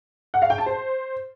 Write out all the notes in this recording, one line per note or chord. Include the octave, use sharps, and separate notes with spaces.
F#5
F5
G5
A5
C5